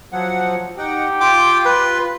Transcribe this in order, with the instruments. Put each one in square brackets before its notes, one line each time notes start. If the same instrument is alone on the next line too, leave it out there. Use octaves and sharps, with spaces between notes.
[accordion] F3 F#3 F#5
[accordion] D#4 F#5 G5 [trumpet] G4
[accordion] F4 C6 [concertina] G5 D6
[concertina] B4